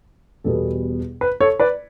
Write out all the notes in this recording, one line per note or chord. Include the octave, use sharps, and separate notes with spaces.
E2 B2 G3 B3 A4
B4
A4 C#5
B4 D5